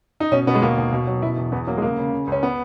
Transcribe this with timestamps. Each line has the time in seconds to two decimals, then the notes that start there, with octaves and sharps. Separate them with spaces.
0.20 D#4
0.32 B2 C#4
0.47 B2 B3
0.55 G#3
0.62 D#2 A#3
0.77 D#2
0.92 B2
1.07 F#3
1.22 B2 E4
1.37 E2
1.52 E2 B3
1.67 F#3 A#3
1.78 G#3
1.82 C#3 A#3
1.98 C#3
2.13 C#3
2.27 C#2 C#4
2.43 B3